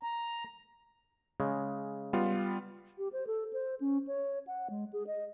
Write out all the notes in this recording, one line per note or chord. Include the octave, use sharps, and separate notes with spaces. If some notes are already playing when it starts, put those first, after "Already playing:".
A#5
C#3 G#3
G3 B3 F4
G4
C5
A4
C5
C#4
C#5
F#5
G#3
G#4
D#5